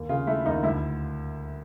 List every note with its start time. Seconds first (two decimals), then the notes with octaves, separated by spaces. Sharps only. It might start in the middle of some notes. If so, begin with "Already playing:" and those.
Already playing: D#2
0.09 C#3 F4
0.27 A3 E4
0.46 D#2 D#4
0.63 D2 E4